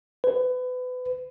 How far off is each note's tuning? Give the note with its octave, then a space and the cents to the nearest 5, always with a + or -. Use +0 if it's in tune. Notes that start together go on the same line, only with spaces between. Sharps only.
B4 +30